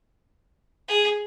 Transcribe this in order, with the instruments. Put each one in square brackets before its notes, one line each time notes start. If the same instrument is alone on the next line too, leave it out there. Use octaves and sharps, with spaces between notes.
[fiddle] G#4